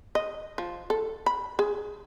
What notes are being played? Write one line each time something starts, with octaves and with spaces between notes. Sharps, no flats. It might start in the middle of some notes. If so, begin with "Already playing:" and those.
D#5
F3
A4
B5
G#4